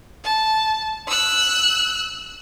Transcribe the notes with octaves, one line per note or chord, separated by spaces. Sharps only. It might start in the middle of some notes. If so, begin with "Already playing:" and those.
A5
E6 F#6